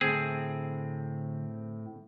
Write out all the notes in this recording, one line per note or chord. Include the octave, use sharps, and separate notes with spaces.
A2 D3 C4 G#4